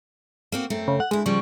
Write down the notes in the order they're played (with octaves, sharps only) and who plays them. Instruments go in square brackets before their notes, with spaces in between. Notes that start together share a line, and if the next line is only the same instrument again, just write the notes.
[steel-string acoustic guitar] A#3 C4 F#4
F#2 A3 C4
[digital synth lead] C#3
F#5
[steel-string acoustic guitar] D2 E4 [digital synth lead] G#3
[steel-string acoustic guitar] C#3 F3 G3 [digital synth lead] C#6